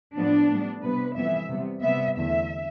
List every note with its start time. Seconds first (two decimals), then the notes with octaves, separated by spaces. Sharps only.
0.16 A2 F3 B3 D4
0.50 A2 G3 B3
0.83 C3 G3 B3 B4
1.17 F2 E3 G3 B3 E5
1.50 C3 G3 B3
1.83 C3 G3 B3 E5
2.16 E2 D3 A3 E5